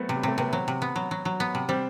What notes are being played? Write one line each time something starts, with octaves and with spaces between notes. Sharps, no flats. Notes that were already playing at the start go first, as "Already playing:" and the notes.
Already playing: F#3 A3 B3 C4
C3
G3
C3 A3
C3 B3
F#3 C4
C3
B3
F#3
F#3
F#3
B3
C3
G3 C4